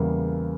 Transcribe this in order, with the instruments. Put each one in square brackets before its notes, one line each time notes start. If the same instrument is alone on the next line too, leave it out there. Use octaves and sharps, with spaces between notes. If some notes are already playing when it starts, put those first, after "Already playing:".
Already playing: [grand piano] E2 C#3 G3 A#3